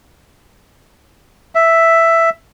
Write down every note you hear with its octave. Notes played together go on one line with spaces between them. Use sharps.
E5